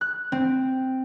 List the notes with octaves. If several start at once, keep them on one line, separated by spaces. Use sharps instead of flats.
F#6
C4